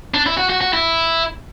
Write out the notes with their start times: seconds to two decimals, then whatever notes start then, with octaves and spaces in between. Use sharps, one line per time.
0.14 D4
0.26 E4
0.38 F#4
0.50 F#4
0.61 F#4
0.73 E4